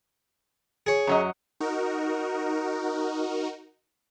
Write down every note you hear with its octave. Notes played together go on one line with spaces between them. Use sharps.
G#4 C#5
F#2 F#3 D#5
D#4 F#4 A#4